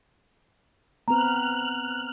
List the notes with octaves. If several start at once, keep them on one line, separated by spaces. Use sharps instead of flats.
B3 C4 B4 A#5 F6 F#6